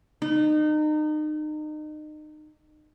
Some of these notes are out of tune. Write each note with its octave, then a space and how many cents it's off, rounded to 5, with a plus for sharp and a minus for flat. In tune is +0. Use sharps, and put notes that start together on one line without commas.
D#4 -30